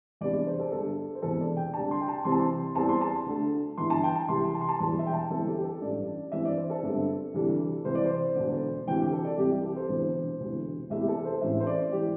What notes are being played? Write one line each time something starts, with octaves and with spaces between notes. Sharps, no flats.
E2 C3 G3 D4 D5
D5
C5
A4
G1 G2 G3 A4
C5
E1 E2 C3 E3 A4
D5
G5
D2 C3 G3 D4 A5
C6
G5
A5
C2 C3 E3 G3 C4 C6
A5
C6
E2 E3 G3 C4 A5
C6
A5
D2 D3 A3
G1 G2 E3 C6
A5
G5
A5
C2 C3 E3 C6
A5
C6
A5
E1 E2 E3 G3 C6
E5
G5
A5
G1 G2 E3 C4 A4
G4
G4
A4
A1 G2 G3 D4 D5
G2 E3 C4 E5
D5
C5
A4
G1 G2 G3 C4
D2 C3 E3 G3 D4
C2 C3 E3 C5
D5
C5
E1 D2 D3
D2 C3 E3 C4 G5
G4
A4
D5
C2 C3 E3 G3 G4
G4
A4
C5
E1 D2 C3 E3
E1 D2 C3 E3
E2 C3 E3 A3 E5
G4
A4
C5
A1 A2 E3 C4 E5
C5
D5
E3 G4